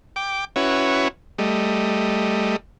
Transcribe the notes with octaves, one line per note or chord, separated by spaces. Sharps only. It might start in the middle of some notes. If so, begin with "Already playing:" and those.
G5 D6
C#4 E4 F#4 B4 C#5
G3 A3 D#5